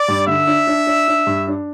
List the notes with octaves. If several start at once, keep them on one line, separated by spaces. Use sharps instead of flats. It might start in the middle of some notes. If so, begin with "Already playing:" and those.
Already playing: D5
G2
D3 E5
D4
D4
D4
D4
G2
D4